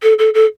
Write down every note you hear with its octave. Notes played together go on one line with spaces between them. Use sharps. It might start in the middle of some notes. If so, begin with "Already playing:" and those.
A4
A4
A4